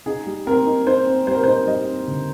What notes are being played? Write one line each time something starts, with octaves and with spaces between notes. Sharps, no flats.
D#4 G#4
G3
C4 A#4
D#4
D#4 C5
C4
G3 C5
A#4
D#4 C5
G3 D#5
C4
D3